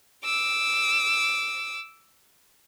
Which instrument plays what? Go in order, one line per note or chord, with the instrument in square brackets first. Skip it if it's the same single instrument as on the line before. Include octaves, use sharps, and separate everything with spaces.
[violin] D6 E6